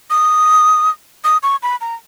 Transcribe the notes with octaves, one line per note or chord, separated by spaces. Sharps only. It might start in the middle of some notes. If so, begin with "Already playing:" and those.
D#6
D#6
C#6
B5
A#5